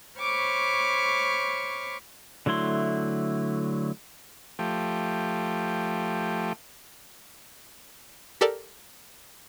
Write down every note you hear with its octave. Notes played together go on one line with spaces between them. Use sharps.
C5 C#5 B5 C#6 D6 F6
D3 F#3 A3 E4 C6
F3 A3 G4
G4 A4 A#4 D5